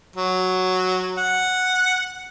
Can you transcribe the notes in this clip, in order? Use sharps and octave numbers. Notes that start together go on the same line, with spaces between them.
F#3
F#5